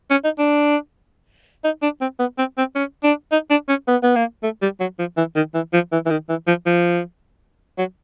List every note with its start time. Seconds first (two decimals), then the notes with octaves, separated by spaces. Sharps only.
0.11 C#4
0.24 D#4
0.39 D4
1.64 D#4
1.83 D4
2.01 C4
2.20 B3
2.38 C4
2.58 C4
2.75 C#4
3.04 D4
3.32 D#4
3.50 D4
3.69 C#4
3.88 B3
4.03 B3
4.16 A#3
4.43 A3
4.62 G3
4.80 F#3
4.99 F3
5.17 E3
5.36 D#3
5.55 E3
5.73 F3
5.92 E3
6.06 E3
6.11 D#3
6.29 E3
6.48 F3
6.66 F3
7.78 F#3